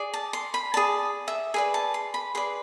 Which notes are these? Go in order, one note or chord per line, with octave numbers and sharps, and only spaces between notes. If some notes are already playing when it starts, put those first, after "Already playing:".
Already playing: G#4 D5
A5
C6
B5
G#4 D5 A5
E5
G#4 B4 D5 G#5
A5
C6
B5
G#4 B4 D5 C6